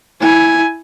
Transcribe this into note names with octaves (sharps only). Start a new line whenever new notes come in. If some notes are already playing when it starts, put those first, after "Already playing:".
E4 G#5